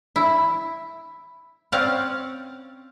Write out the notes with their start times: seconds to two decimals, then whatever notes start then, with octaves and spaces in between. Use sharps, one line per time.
0.16 E4
1.72 C4 C#4 D5 F5 F#5